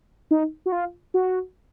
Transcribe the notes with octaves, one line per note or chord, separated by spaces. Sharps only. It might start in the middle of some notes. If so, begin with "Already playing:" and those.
D#4
F#4
F4
F#4